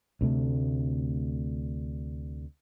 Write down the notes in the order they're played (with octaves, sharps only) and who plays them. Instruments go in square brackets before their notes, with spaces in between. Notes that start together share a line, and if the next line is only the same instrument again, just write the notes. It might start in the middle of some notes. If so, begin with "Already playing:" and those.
[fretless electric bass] D2 C3 A3